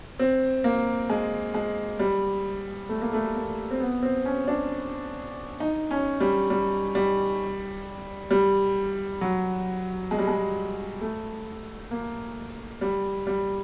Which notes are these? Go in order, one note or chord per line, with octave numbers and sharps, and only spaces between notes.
C4
A#3
G#3
G#3
G3
A3
A#3
A3
A#3
C4
B3
C4
C#4
D4
D#4
C#4
G3
G3
G3
G3
F#3
G#3
G3
G#3
A3
A#3
G3
G3